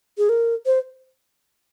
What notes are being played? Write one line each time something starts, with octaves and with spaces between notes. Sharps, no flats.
G#4
A#4
C5